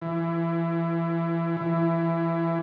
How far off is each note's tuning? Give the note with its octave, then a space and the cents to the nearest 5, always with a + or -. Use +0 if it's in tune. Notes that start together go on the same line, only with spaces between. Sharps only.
E3 +25
E3 +20